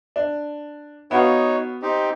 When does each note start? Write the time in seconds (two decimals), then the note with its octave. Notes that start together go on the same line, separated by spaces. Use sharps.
0.16 D4
1.11 B3 D#4 F#4 C#5 F5
1.82 C4 D#4 G4